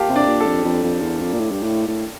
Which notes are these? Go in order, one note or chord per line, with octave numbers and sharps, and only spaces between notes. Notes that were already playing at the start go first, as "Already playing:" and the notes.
Already playing: A#3 F4 G4 F5 G5 A5
C3
D4 D5
A#2
A4 A5
F2
F2
F2
E2
F2
A#2
A2
G2
A2
A2